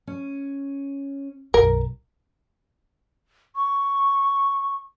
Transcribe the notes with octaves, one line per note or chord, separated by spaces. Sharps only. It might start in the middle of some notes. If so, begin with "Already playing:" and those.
C#4
B1 F#2 A#4
C#6